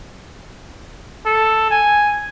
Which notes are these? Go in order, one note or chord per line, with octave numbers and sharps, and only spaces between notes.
A4
G#5